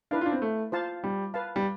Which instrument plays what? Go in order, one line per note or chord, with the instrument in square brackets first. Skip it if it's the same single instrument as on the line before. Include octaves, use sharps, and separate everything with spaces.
[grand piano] D4 [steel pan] E4 B4 F5
[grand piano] F4
D4
C4
A3
[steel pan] F4 C5 F5 A5
[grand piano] G3
[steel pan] B4 F5 A5
[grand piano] G3